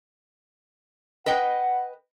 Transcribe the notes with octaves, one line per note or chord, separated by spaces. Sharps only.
B4 D#5 F#5 G5